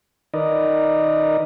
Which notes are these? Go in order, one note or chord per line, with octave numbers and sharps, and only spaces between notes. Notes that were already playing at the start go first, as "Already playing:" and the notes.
D#3 D#4 A#4 B4 D5 D#5